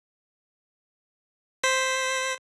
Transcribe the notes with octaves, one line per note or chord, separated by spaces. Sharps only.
C5 B6